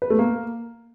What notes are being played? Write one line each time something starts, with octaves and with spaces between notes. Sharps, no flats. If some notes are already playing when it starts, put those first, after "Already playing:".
B4
A3
A#3